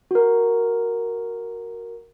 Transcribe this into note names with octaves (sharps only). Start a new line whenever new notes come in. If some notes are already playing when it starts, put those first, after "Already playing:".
F#4 A#4